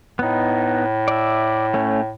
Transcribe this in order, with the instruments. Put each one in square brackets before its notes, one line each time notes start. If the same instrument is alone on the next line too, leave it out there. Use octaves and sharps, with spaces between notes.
[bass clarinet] A2 [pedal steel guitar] B3 D#4
[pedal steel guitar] D5 E5
A3 C#4